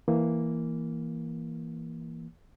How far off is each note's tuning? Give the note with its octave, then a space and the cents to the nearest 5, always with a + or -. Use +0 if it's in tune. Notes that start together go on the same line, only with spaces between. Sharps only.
E3 +0 A#3 +0